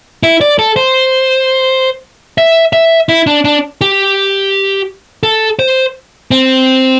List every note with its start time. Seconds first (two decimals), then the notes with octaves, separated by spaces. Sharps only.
0.23 E4
0.41 D5
0.59 A4
0.76 C5
2.38 E5
2.73 E5
3.09 E4
3.27 D4
3.45 D4
3.81 G4
5.23 A4
5.59 C5
6.31 C4